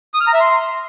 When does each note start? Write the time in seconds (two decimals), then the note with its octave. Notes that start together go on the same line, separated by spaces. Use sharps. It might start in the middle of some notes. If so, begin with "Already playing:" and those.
0.14 D#6
0.21 F6
0.27 A#5
0.34 E5
0.40 C6